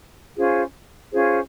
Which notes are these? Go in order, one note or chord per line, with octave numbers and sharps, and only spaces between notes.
C#4 F4 G#4 C5
C#4 F4 G#4 C5